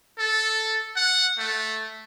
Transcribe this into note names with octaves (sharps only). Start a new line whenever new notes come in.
A4
F#5
A3